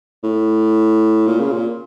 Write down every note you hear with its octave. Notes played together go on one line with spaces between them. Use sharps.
A2
A#2
C#3
A#2